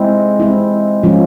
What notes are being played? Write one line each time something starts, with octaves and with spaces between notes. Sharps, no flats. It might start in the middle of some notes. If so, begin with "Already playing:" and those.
Already playing: G#3 C4 E4
G#3 C4 E4
F3 G#3 C#4 F4